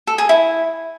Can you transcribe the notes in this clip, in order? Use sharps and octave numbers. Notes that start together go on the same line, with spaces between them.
A4
G#4
E4